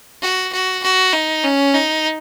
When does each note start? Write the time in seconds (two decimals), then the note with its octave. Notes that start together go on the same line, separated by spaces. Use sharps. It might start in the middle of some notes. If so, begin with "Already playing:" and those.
0.22 F#4
0.52 F#4
0.83 F#4
1.13 D#4
1.44 C#4
1.74 D#4